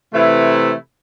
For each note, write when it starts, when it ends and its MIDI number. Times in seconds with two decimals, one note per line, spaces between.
0.13 0.73 48
0.13 0.73 52
0.13 0.73 57
0.13 0.73 64